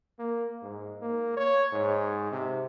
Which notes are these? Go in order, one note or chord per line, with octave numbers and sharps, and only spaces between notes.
A#3
G#2
A#3
C#5
G#2
C3